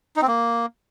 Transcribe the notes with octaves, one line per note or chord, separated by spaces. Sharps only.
D#4
C4
A#3